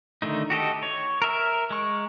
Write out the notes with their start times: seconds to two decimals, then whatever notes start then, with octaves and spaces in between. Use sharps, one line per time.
0.22 D3 D#3 A3 D#4
0.50 F#4 G4 A4 D#5
0.83 C#5
1.22 A#4 E5 F6
1.70 G#3 C#6